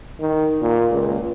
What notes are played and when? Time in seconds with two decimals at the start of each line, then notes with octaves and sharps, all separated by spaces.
0.20 D#3
0.62 A#2
0.91 C#2